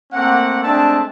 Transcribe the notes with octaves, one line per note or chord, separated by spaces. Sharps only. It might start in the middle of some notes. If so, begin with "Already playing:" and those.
A3 A#3 C4 F#5
G#3 A3 C4 D4 E5 A5